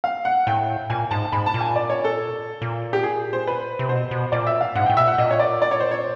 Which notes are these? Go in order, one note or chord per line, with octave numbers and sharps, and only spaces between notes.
F5
F#5
A2 G5
A#2 G#5
G#2 A5
G#2 B5
A5
A#2
G#5
D5
C#5
A4
A#2
G4
G#4
C5
B4
C3
B2 C5
B2
A#2 D5
E5
F5
G#2 F#5
A2 G5
B2 E5
A#2 F#5
A#2 D#5
C#5
D5
D5
C#5
C5
C#5